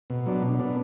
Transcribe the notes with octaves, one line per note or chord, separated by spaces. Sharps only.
B2
F#3 B3 D4
B2
B3 D4